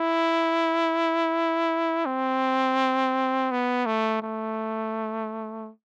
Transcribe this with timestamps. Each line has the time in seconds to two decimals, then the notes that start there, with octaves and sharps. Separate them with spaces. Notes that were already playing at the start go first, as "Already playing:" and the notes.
Already playing: E4
2.06 C4
3.51 B3
3.86 A3
4.22 A3